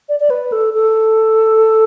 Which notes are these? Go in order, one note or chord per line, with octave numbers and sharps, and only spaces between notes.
D5
D5
B4
A4
A4